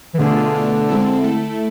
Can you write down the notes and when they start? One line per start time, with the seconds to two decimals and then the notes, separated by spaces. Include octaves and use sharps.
0.14 E3
0.19 B2 D3 A3 D4 F4 G#4
0.54 B2 A3 D4
0.89 G#3 C4 E4 A4
1.24 A3 E4 A4